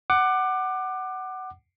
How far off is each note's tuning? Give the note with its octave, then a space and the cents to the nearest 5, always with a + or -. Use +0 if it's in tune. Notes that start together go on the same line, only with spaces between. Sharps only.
F#5 +15 D6 +25